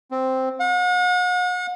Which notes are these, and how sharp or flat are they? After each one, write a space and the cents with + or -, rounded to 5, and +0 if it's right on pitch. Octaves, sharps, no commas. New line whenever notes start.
C4 +0
F#5 -40